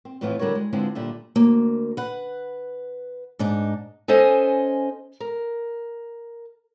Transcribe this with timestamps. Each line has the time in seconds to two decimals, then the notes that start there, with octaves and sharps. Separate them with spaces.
0.05 C4
0.21 F2 A2 E3 F3 B3 F4
0.39 D3 G3 F#4 A#4 C#5
0.55 G#3
0.73 D3 G#3 B3 C4 E4 F4
0.95 A#2 D3 G3 E5
1.36 D2 A#3
1.97 B4 F#5
3.39 G#2 D4 D#4
4.08 C#4 A4 C5 D#5 G#5
5.20 A#4